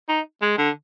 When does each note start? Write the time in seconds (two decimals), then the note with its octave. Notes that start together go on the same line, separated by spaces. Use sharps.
0.09 D#4
0.42 G#3
0.58 D3